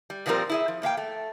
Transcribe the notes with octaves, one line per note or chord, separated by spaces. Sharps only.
G3
A#2 D#3 F3 G3 C4 A#4
E4 G#4 E5
F3
A2 A#3 F5 G5
A3